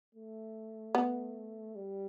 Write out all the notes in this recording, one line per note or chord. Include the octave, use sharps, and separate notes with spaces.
A3
B3
G3